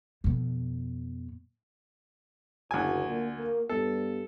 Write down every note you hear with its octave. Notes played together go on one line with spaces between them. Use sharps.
F2 B2
F#1 D2 G#5
A#2 A#3
A#3
G2 G3 B3 A4